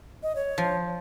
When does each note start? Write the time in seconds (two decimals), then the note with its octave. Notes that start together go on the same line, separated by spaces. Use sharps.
0.23 D#5
0.36 C#5
0.58 F3